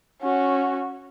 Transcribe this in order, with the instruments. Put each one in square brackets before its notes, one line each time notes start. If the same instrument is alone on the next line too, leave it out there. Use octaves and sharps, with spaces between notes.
[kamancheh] C#4 F#4